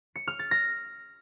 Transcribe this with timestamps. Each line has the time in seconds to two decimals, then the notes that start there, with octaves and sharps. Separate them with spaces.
0.16 C#7
0.27 F6
0.39 A6
0.51 A#6